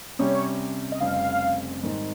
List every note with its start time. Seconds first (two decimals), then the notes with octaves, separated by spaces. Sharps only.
0.19 C3 G3 C#4 G4 C#5
0.92 D#5
1.00 F1 F2 C#3 G3 C4 F5
1.83 G#2 D#3 G3 C4 D#4